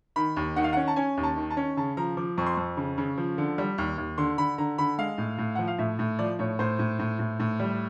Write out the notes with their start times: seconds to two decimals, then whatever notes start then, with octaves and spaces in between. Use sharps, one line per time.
0.16 D#3 B5
0.37 D#2
0.56 D#3 F#5
0.64 F5
0.73 C#4 F#5
0.88 A5
0.96 C#4 G#5
1.17 D#2
1.23 A5
1.37 D#3
1.50 A5
1.57 C#4
1.77 C#3 A5
1.97 F3 A#5
2.17 F3 D6
2.38 F2 C#6
2.46 C6
2.54 F2 C#6
2.77 C#3
2.98 C#3
3.18 F3
3.38 D3
3.58 G3
3.78 D#2
3.98 D#2
4.18 D3 C6
4.38 D3 B5
4.58 D3 A#5
4.78 D3 B5
4.98 G#3 F5
5.18 A2
5.38 A2
5.55 F3 F#5
5.68 F5
5.78 A2 E5
5.99 A2
6.19 F3 D5
6.39 A2 C#5
6.59 A2 C5
6.79 A2
6.99 A2
7.19 A2
7.40 A2
7.60 G3